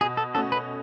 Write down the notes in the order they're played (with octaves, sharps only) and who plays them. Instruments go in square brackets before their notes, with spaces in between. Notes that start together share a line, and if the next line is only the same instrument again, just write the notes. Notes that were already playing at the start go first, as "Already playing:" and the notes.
[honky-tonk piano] B2 [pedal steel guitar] G#4
[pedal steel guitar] A4
[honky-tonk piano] A3 C#4 F#4 [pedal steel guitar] A4
[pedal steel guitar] B4